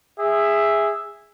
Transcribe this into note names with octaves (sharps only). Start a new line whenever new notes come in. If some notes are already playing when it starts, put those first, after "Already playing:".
G#4 E5